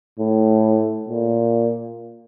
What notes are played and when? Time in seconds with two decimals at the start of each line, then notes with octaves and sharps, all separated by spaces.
0.19 A2
1.08 A#2